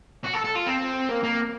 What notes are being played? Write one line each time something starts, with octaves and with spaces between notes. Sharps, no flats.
F#4
A4
A4
F4
C4
A#3
A#3